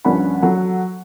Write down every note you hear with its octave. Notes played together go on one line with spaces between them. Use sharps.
A#1 G2 C#4 D4 F#5 B5
F#3 A4 F#5